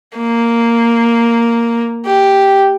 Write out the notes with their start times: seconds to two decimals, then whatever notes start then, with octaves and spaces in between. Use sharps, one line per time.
0.17 A#3
2.06 G4